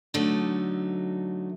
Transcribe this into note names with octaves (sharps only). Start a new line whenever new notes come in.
D3 F#3 A3 D#4